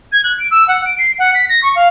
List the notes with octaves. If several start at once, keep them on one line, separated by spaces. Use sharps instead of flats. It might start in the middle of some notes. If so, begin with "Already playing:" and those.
G#6
F#6
D7
E6
F#5
D7
C7
F#5
B6
A#6
C#6
F5